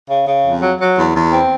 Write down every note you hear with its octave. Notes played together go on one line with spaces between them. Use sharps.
C#3
C#3
F2
F#3
F#3
E2
E2
C4